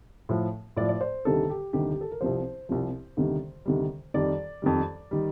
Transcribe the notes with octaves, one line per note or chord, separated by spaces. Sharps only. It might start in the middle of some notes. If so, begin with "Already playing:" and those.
A2 F3
A2 F3 D5
D5
C5
D2 C3 D#3 G3 A4
G4
D2 C3 D#3 G3 G4
G4
A4
A#4
C2 C3 F3 C5
C2 C3 F3
D2 C3 D#3 G3
D2 C3 D#3 G3
F2 D#3 G3 D5
F2 D#3 G3
D#3 G3